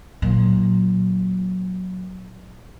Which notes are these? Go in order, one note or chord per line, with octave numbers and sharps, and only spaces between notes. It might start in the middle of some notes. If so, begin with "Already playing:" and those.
A#2 F#3